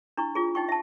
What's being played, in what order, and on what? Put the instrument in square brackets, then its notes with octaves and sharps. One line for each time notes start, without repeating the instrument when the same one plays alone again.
[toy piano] D4 E4 C#6
F4 G#4
D#4 G5 C#6
E5 A5